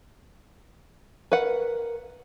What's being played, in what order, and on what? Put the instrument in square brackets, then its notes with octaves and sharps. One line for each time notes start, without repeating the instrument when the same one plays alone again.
[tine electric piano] A#4 [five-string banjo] B4 F#5